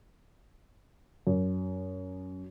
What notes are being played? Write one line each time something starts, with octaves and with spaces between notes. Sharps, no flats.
F#2